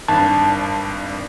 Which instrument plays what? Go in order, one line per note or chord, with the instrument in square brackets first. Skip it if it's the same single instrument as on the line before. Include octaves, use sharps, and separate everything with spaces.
[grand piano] G#1 G2 [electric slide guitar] A5